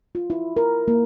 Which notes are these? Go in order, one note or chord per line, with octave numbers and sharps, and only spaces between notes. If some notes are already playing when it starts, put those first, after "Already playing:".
F4
E4
A#4
A#3